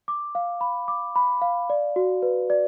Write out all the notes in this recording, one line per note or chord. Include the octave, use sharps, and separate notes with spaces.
D6
F5
B5
D6
B5
F5
D5
F#4
B4
D5